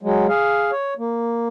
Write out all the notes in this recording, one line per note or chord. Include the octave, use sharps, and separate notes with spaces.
F#3 G#3
G#4 F5
C#5
A#3